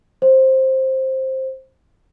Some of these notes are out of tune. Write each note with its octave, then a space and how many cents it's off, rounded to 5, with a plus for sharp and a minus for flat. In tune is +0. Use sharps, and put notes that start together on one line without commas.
C5 +10